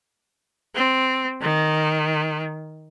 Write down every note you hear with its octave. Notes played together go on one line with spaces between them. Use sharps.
C4
D#3